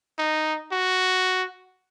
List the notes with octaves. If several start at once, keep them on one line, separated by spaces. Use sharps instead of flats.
D#4
F#4